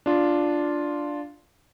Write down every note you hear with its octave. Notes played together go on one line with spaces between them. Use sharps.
D4 F4